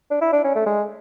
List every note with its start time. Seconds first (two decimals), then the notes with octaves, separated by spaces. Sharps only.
0.10 D4
0.21 E4
0.33 D4
0.44 C#4
0.55 A3
0.66 G#3